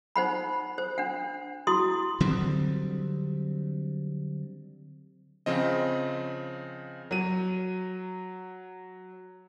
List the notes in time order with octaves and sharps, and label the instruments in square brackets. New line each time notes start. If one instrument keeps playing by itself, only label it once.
[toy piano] D#4 C5 F#5 B5
C5
D4 F#5
E4 F#4 C6 D#6
[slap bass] D3 F#3 G3 C4
[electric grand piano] C#3 F3 C4 D#5
[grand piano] F#3 D#7